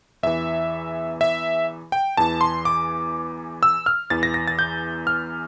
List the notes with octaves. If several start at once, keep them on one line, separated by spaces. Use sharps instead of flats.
E2 E3 E5
E5
G5
E2 E3 A5
C6
D6
E6
F6
E2 E3 A6
A#6
A#6
A6
G6
F6